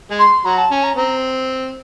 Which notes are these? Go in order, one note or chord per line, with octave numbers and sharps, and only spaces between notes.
G#3 G#4
C6
F#3 F#4 A#5
A5
C#4 G#5
A#5
C4 A#5